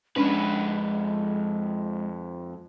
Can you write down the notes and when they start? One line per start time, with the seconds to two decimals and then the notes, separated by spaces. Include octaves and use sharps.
0.16 F2 G#3 C#4 D4 B4